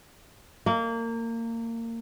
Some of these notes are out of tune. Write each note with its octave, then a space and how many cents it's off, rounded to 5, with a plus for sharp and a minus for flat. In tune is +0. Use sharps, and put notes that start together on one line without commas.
A#3 -25